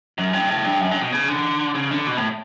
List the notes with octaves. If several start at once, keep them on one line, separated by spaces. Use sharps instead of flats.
F#2
G2
A2
G2
F#2
G2
B2
C#3
D3
C#3
D3
B2
A2